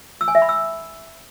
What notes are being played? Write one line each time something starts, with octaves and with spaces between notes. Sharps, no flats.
E6
G#5
E5
B5
E6